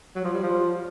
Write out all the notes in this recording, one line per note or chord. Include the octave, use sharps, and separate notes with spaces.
F#3
F3
G3
F3